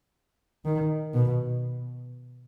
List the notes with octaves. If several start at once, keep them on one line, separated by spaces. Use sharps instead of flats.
D#3
B2